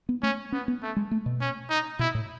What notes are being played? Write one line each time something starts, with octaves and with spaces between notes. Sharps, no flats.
B3
A3 C#4
B3 C#4
B3
A3
G#3
A3
B2
C#4
D#4
B2 E4
A2